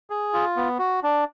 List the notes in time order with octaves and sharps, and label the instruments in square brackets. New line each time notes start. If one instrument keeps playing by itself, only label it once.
[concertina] G#4
F4
B3
F#4
D4